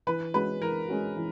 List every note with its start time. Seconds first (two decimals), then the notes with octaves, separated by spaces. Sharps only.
0.07 E3 B4
0.34 G#3 C#4 F#4 B4
0.61 E3 A#4
0.89 G#3 C#4 F#4
1.16 E3